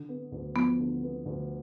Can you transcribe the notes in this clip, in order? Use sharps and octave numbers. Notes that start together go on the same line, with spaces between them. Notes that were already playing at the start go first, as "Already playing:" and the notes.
Already playing: D3
B3
D2
F3 B3
D3
B3
D2